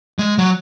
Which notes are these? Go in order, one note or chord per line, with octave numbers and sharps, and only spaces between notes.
G#3
F#3